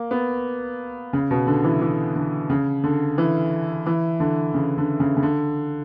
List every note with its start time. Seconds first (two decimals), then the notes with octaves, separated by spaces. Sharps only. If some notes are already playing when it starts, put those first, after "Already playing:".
Already playing: A#3
0.11 B3
1.13 C#3
1.31 B2
1.47 D3
1.64 E3
1.82 E3
2.16 D3
2.50 C#3
2.84 D3
3.18 E3
3.86 E3
4.20 D3
4.54 C#3
4.77 D3
5.00 C#3
5.17 C#3
5.23 D3